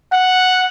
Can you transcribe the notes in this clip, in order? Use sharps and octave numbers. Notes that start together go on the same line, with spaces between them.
F#5